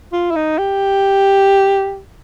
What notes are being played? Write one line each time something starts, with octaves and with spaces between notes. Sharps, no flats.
F4
E4
D#4
G4